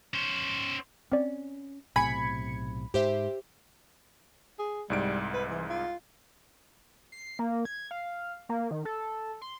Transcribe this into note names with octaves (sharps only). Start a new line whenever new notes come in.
C#4 C5
C4 C#4 D5
B1 A2 C3 G#5 B5 G#6 C#7
G#2 G4 C5 E5
G#4
C2 G#2 G3 D7
B4
E3
F4
C7
A#3
G#6
F5
A#3
D#3
A4
C6